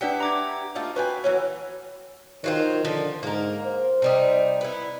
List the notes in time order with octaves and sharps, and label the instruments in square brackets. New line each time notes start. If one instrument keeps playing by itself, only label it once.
[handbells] D4 B4 F#5 [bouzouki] G4 D5 E5
[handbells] A#5 D6 G#6
[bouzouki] A3 D#4 F4
[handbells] F#4 [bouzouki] B4 G5 G#5
[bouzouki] E3 F#3 C#4
[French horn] D#3 [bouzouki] F#3 F4 C5
[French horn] D3 [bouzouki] F3
[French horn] G#2 [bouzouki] A#3 A#4
[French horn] C5
[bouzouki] C3 G3 D#4
B3 E4